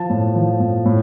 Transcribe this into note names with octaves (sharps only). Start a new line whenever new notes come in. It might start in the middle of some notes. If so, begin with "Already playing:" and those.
Already playing: F3 A5
A2
F3
A2
A2